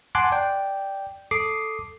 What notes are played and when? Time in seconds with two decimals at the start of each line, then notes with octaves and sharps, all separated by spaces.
0.15 F#5 G#5 A5 C6 D6 F#6
0.32 D5 G5
1.31 A4 D6 D#6 C7